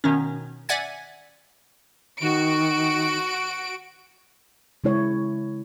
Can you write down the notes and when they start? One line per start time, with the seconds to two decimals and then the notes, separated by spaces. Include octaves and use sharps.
0.04 B2 D#3 C#4
0.69 D5 E5 F#5 G#5 G#6
2.21 D#3 F#4 D7
4.84 C#3 G#3 E4 C#5